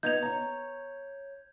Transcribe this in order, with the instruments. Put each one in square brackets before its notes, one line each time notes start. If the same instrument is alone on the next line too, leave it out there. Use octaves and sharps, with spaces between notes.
[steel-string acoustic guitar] B3 D#4 D#5 [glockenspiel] G6 G#6 F7
[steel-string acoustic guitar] C#5 A#5